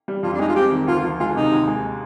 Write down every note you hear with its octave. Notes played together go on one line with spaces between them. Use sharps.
G3
F2 F4
D4
G#3 D#4
F4
C4 G4
D#3
D2 F4
F3
G#3 F4
C3 D#4
D#2
G#3